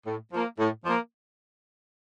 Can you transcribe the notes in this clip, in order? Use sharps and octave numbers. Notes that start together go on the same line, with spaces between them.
A2
F3 A#3
A2
F3 A#3